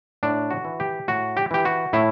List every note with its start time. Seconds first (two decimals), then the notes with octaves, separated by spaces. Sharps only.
0.23 A2 D4
0.50 F#4
0.65 E3
0.80 G4
1.08 A2 F#4
1.37 G4
1.51 E3 G4
1.65 F#4
1.93 A2 E4